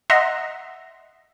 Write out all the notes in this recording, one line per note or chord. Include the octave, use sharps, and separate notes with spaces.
D#5 E5 F#5 A#5 C6